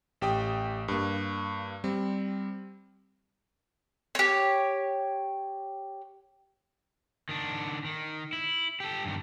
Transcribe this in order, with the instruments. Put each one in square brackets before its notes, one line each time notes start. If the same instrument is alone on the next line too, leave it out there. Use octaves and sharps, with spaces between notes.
[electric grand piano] A1 G4 G5 D#6
G2 A#3
G3 C4
[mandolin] G4 C#5
[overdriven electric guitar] D#3 D4
D#3
E4
G4 A4
G2 D#3